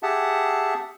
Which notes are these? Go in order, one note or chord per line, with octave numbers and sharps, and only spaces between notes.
G4 G#4 E5 F#5 A5